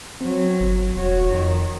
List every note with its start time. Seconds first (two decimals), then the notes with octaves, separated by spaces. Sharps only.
0.21 F#3 C4
0.60 G1
0.96 E1 F#4 C#5
1.31 F2 D#3